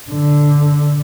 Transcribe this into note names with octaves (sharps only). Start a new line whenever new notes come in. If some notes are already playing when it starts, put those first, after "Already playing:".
D3